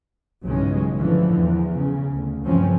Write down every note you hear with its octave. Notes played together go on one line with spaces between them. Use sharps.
B1 G2 C#3 E3 G#3 C#4
A2 D3 E3 F3
E2
C#3
D2
G2 C#3 E3 F3 C4 C#4